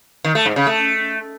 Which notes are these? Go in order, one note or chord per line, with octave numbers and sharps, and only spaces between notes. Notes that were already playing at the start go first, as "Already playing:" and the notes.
D#3
A3
G#2
C#3
A3